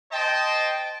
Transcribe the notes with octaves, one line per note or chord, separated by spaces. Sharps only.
C5 D#5 G5 A5